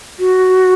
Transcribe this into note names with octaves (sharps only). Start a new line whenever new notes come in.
F#4